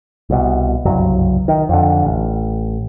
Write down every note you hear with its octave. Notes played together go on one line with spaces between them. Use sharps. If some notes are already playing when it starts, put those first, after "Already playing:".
C2 B2
F#1 C2 G2 F#3
D#3
F2 D3
A1